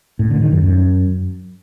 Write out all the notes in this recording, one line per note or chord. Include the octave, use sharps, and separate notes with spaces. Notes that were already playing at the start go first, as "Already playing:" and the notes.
A2
D3
D#3
F#2
F#2